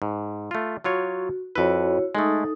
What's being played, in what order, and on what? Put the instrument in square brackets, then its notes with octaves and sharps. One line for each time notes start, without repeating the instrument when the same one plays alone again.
[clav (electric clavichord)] G#2
A3 F4
[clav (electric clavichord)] F#3 F4 C#5 [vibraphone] F#4
[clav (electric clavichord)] F2 B4 [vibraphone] E4 F#4 C#5
[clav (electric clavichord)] G#3 A3 [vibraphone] D#4 A4 D#6